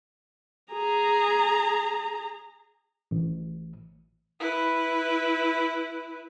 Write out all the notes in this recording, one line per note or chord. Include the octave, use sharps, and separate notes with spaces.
G#4 A#5
A1
E4 B4